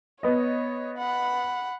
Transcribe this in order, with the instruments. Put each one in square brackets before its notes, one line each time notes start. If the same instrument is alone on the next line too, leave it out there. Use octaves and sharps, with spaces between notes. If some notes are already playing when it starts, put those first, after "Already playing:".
[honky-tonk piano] B3 D#5 [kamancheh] C#5
[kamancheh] F#5 B5